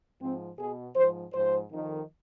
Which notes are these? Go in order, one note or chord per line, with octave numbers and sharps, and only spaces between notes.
G#2 F3 C4
B2 G#4
G#2 F3 C5
G#2 F3 C5
F2 D#3